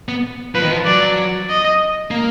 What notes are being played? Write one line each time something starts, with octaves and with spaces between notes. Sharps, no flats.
B3
F3 B4
D#3
F3
F#3 D5
D#5
A#3